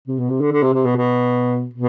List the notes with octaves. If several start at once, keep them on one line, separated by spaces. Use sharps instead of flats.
C3
B2
C3
D3
D3
C3
C3
B2
B2
B2